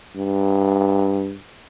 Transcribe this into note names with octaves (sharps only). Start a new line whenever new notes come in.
G2